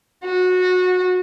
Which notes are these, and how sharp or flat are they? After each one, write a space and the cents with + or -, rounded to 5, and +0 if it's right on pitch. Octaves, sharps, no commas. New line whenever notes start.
F#4 -20